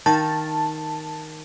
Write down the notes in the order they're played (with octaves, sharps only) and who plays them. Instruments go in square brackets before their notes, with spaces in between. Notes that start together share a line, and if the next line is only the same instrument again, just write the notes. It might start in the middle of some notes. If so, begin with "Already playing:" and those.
[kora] D#3 F5 [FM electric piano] A5